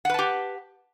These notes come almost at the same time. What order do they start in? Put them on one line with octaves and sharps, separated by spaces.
F#5 B4 A5 G4